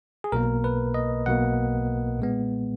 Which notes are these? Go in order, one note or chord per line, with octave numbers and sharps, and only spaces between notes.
G#4
B1 B2 A#3 A#4
B4
D#5
B1 B2 A#3 F#5
A#2 G#3 B3